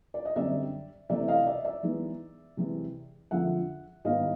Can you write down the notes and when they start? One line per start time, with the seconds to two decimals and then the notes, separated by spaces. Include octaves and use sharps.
0.14 D5
0.25 D#5
0.36 F#2 D3 G3 C4 D5 E5
1.10 C3 E3 A3 C4 E4 D5 E5
1.28 D#5 F5
1.47 D5 E5
1.65 D5 E5
1.83 E3 G#3 B3 D#4
2.57 C3 E3 G#3
3.31 F2 D3 F3 G#3 E5 F#5
4.05 G#2 D#3 G3 B3 E4 D#5 F5